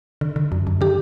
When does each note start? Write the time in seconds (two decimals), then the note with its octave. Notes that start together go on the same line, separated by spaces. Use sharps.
0.21 D3
0.36 D3
0.52 F#2
0.67 F#2
0.81 D3 G4